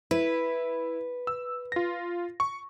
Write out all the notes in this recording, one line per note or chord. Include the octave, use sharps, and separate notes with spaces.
E4 B4
E6
F4 A#6
C#6